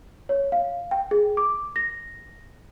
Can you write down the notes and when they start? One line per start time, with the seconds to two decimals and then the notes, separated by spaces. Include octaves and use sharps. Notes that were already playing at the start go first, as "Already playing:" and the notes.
0.29 C#5
0.52 F5
0.91 G5
1.11 G#4
1.37 D6
1.76 A#6